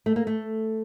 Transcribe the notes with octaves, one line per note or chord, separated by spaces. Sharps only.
A3
A#3
A3